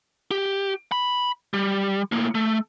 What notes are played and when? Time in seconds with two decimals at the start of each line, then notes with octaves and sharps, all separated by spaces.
0.31 G4
0.92 B5
1.54 G3
2.12 A2 A#3
2.35 A3